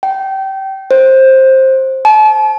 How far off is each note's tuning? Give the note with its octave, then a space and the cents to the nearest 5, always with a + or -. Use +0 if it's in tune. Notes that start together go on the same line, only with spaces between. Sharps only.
G5 -25
C5 +15
A5 -40